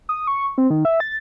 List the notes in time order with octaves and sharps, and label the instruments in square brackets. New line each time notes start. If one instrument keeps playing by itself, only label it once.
[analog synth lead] D#6
C#6
C4
D#3
E5
A6